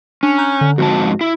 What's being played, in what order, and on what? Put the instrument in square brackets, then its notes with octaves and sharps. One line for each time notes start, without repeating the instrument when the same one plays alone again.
[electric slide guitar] C#4 [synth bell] D4 F7
[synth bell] A#5 F#6 G6
D3
[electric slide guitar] F2 G#2 A5 [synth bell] F#4
[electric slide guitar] E4